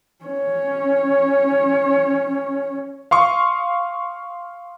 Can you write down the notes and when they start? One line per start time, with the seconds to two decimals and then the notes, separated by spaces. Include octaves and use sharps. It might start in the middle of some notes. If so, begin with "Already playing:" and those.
0.25 C#4 C#5
3.11 F5 C6 C#6 D#6